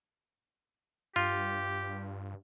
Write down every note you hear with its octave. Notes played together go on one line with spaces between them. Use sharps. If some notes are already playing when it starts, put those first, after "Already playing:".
G2 F4 G4